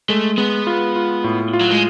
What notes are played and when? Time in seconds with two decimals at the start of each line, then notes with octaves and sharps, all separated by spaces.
0.09 G#3 A3
0.38 G#3 B3
0.67 F4
0.96 F4
1.24 A2
1.53 F4
1.61 F#3
1.71 G#3